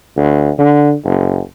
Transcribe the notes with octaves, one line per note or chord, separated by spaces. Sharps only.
D2
D3
F#1